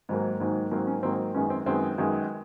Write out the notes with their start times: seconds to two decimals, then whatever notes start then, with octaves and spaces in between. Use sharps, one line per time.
0.09 G#2 D#3 F#3 A#3
0.40 G#2 D#3 F#3 A#3
0.71 G#2 D#3 F#3 A#3 C4
0.87 C#4
1.03 G#2 D#3 F#3 A#3 C4
1.34 F#2 D#3 G#3 B3 C#4
1.50 C4
1.66 F#2 D#3 G#3 B3 C4
1.98 F#2 D#3 G#3 B3